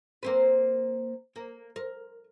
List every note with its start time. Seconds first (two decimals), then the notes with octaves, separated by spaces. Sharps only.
0.23 A#3 C4 B4
1.36 A#3
1.76 A#4